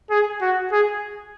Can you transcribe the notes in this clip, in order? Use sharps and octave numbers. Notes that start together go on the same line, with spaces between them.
G#4
F#4
G#4